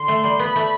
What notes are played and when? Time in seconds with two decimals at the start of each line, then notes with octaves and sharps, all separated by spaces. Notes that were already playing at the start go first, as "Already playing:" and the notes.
Already playing: D3 C6
0.08 A3
0.24 G3
0.39 B3 B5
0.56 A3